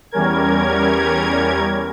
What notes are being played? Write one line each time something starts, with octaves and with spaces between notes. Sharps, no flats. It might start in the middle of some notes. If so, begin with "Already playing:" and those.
E2 G3 C#4 A#4 G#6